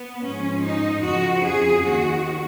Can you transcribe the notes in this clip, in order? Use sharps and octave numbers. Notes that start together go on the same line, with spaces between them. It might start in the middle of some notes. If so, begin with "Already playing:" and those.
Already playing: B3
G#2 F3 C#4
D#4
F2 C#3 F3 F#4
G#4
D#2 D#3 F#4